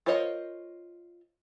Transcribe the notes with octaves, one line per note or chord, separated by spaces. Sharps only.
F4 A#4 C5 C#5 D#5